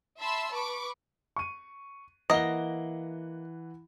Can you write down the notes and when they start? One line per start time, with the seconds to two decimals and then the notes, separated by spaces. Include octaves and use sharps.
0.19 E5 A5 B5 C6 E6
0.52 B4 B5 C#6 D6
1.36 C#6 D#7
2.30 E3 A#3 D#5 F#5 G7